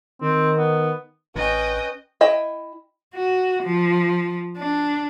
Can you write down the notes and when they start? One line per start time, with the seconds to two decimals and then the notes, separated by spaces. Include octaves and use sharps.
0.22 D#3 C4
0.58 B3
1.36 A1 C#4 B4 D#5 G5
2.21 E4 D#5 G5
3.14 F#4
3.63 F3
4.57 D4